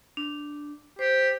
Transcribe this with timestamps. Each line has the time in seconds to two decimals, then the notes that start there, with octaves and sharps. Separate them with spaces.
0.17 D4
0.99 G4 C5